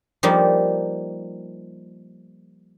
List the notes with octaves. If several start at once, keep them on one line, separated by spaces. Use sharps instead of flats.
F3 G3 A#3 D#4